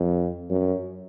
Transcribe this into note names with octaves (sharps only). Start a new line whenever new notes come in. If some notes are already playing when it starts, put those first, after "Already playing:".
Already playing: F2
F#2